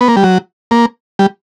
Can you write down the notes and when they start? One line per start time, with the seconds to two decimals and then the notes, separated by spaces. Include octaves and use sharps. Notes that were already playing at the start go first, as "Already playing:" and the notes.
0.01 B3
0.08 A#3
0.16 G3
0.24 F#3
0.71 A#3
1.19 G3